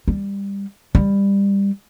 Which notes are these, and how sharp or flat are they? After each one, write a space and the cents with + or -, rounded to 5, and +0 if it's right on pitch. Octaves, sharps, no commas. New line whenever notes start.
G3 +20
G3 +20